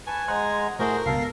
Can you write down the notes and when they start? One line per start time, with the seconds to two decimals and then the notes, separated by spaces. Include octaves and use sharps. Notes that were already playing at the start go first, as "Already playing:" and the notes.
0.07 B4 G#5 A5 C#6
0.28 G#3 C5 F#5 A#5
0.79 A2 A3 F#4 G#4 A#4 C5
1.06 C#2 G2 B2 A4 F5